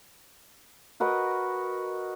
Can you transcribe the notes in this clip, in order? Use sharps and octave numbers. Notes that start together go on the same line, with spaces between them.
F#4 A#4 B4 D#5